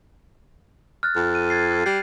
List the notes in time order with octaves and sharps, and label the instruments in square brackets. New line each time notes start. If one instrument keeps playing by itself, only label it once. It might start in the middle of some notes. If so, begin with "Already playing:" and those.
[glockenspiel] F6 F#6 A6
[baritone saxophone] F2
[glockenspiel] D#7
G#6 A6 C7
[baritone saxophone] G3 [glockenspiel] G6 C7